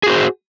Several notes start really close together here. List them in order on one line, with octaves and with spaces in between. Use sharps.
G#4 F#4 C5